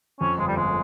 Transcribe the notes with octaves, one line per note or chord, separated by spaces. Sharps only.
F2 C#4
G1 G#3
G3
G1 G#3